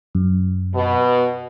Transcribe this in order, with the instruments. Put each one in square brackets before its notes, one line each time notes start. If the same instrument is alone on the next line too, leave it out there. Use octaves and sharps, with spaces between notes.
[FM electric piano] F#2
[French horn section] B2